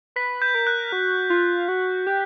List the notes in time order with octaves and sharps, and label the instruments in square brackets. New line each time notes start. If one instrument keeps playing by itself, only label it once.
[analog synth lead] B4 [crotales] B6
[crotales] G6
[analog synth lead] A#4
[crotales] F#6
[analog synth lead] F#4
F4
F#4
G4